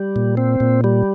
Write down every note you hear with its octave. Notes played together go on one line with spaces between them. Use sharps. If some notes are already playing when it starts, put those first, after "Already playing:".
Already playing: G3
A#2
C4
A#2
G3